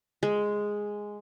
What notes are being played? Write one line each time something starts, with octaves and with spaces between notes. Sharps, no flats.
G#3